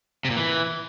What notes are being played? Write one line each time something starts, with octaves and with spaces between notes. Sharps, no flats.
C3
A#2
E3